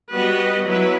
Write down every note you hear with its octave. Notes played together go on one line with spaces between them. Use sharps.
G3 B3 F#4 B4 D#5
F#3 B3 E4 B4